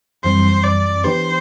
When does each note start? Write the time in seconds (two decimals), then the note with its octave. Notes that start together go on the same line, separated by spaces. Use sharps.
0.24 F#2 E3 G3 C4 C5
0.64 D5
1.04 E3 B3 D4 G4 B4 C5